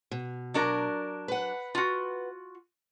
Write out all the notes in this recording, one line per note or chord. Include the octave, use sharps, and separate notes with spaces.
B2
F#3 D4 A#4
B4 F#5
F4 F#4